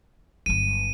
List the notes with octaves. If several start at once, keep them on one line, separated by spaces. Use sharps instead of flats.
G1 F#3 D#7